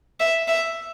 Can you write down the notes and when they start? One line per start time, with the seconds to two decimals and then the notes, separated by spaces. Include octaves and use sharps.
0.20 E5
0.48 E5